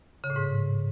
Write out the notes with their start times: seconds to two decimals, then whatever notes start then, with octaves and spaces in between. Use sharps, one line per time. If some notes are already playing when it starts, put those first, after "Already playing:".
0.24 C#3
0.30 A2
0.36 G#2